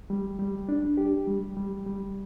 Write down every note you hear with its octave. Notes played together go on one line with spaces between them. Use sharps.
G3
G3
D4
G4
G3
G3
G3